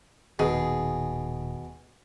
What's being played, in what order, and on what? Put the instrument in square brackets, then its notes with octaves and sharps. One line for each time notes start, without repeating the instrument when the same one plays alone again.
[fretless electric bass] D#1 D#3 [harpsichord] B2 [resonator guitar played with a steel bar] G#4